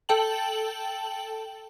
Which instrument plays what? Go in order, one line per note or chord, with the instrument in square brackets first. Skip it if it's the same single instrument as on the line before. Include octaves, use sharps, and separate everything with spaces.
[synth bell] A4 G5 A5 F#7